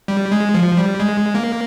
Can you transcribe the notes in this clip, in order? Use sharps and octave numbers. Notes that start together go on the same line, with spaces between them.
G3
G#3
F3
G3
G#3
A#3